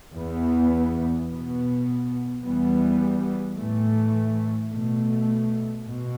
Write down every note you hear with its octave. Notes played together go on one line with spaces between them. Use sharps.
E2 E3 B3
B2 B3
E2 E3 G3 B3
A2 E3 A3
B2 A3
B2